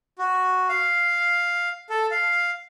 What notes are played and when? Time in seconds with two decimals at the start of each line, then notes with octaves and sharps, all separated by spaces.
0.19 F#4
0.69 F5
1.90 A4
2.11 F5